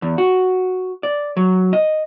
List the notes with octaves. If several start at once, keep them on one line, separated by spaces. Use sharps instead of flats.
E2
F#4
D5
F#3
D#5